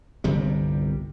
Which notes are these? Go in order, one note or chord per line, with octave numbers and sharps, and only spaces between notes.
G1 C2 C3 G3